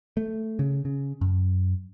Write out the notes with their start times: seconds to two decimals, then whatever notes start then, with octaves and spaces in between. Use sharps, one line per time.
0.17 A3
0.59 C#3
0.85 C#3
1.21 F#2